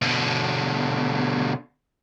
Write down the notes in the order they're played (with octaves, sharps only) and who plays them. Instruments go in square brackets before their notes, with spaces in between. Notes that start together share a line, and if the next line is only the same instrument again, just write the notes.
[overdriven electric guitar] B2 D3